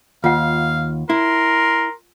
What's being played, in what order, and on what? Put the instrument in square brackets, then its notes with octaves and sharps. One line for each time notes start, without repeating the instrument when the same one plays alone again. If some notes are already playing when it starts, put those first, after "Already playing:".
[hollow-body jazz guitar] D#2 [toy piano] F4 F#5 [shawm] F5
[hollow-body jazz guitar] E4 [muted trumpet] A#4 [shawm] C6